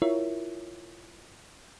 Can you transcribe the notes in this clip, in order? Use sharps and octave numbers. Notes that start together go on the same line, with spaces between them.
E4 F4 A#4 C#5 E5